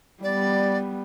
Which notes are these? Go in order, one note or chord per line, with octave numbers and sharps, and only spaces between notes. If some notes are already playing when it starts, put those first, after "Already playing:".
G3 B3 D5